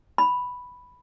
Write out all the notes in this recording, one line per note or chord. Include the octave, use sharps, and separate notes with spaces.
B5